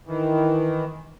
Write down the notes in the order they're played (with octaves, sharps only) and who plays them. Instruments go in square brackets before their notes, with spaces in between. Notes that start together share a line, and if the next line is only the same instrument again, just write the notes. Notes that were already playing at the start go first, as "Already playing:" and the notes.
[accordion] D#3 E3